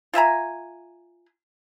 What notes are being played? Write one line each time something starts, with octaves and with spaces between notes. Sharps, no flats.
F4 E5 G#5 A#5